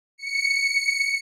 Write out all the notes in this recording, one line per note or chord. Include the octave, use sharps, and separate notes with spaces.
C#7